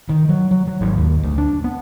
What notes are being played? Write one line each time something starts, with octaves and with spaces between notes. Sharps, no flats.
D#3
F#3
F#3
F#3
G#1
D#2
D2
D4
B3